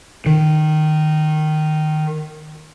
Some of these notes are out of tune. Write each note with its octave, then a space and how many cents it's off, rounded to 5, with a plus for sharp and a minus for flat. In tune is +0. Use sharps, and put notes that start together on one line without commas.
D#3 -10